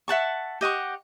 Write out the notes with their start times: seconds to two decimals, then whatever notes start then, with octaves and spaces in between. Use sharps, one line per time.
0.08 E5 F#5 A5 C#6
0.61 G4 D#5 F#5 C#6